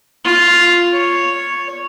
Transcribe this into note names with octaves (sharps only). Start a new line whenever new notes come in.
F4
C#5